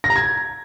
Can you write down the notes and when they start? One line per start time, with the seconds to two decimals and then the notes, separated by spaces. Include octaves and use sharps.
0.04 A#6
0.10 A#5
0.16 G#6